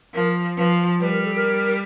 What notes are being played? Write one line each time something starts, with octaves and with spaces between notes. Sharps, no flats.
F3 A#4
F3 B4
G3 B4
A#4
A4
A#4